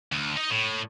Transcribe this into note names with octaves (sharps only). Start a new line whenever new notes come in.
D2
D#4 D#5
A2